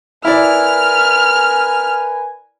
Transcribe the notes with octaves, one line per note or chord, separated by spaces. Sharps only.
E4 A#4 B4 D5 G#5 F6